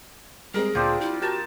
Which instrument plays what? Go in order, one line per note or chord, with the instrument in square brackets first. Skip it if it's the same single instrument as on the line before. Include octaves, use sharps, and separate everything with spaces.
[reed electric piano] G3 G#3 C4 [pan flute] G#4 [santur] A#4
[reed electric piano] D2 A#2 [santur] F3 C4 D4
[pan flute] E4 [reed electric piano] G4
[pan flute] F#4 [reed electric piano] G4 [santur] A#4 A5